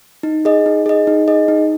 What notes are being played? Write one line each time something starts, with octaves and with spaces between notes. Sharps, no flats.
D#4
G#4 D#5
D#4
G#4 D#5
D#4
G#4 D#5
D#4